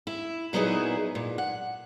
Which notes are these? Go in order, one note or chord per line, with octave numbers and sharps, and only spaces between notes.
E4
A#2 F#3 B3 D#4 E4 G#4
A#2
F#5